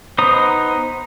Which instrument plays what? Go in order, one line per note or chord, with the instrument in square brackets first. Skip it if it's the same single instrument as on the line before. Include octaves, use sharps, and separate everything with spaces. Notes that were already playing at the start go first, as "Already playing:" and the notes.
[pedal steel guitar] B3 D#4 C5 A#5 D#6